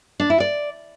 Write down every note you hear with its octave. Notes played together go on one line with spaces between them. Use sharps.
D4
E4
D5